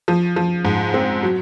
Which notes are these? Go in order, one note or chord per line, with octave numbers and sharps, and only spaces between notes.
F3
F3
G#2
C4
F#3